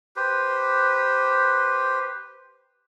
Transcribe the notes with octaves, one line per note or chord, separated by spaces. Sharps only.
G4 B4 C5